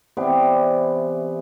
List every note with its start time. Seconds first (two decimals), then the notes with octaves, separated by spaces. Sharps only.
0.17 C3 E3 B3 D5